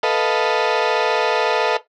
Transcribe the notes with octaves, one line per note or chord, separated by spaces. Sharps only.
A4 B4 D#5 F5